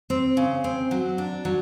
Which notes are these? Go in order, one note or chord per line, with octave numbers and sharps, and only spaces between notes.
C4
C#3
C4
F#3
D4
F#3